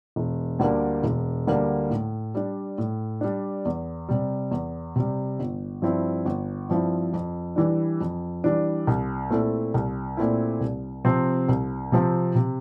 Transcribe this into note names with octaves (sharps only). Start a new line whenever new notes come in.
E1
D2 D3 G3 A#3
E1
D2 D3 G3 A#3
A2
G3 D4
A2
G3 D4
E2
C3 G3
E2
C3 G3
G1
G2 F3 C4 E4
G1
G2 F3 C4 E4
F2
E3 G3 D4
F2
E3 G3 D4
C2
A#2 A3 C4 E4
C2
A#2 A3 C4 E4
C2
C3 F3 C4
C2
C3 F3 C4
C3